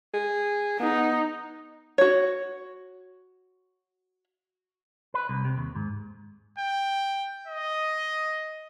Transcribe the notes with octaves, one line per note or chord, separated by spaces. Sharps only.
G#4
B3 D#4
F#4 C#5
B4
C2
C3
D#2
G#2
G5
D#5